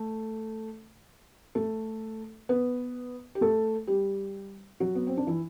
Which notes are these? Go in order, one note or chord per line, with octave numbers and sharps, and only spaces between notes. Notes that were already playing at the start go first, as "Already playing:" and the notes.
Already playing: A3 A4
A3 A4
B3 B4
G4
A3 A4
G3 G4
F#3 F#4
B3
C4
D4
E3 E4